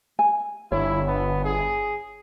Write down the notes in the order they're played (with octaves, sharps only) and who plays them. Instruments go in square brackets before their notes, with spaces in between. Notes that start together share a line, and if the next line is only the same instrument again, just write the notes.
[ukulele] G#5
[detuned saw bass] G1 [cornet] E4 [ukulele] C#5
[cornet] B3
G#4